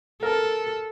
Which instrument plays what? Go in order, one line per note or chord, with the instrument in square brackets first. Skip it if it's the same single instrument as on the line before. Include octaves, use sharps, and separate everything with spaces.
[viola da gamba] A4 [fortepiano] A#4